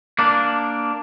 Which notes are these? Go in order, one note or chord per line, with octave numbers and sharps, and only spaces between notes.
A#3 D4